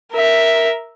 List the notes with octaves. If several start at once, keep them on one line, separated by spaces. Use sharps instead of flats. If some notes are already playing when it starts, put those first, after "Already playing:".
A#4 E5